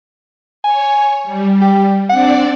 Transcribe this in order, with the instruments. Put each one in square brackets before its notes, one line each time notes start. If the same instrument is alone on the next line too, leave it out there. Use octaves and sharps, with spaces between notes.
[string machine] C#5 [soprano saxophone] G#5
[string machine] G3
[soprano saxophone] G4
[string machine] C4 D4 D5 [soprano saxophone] F#5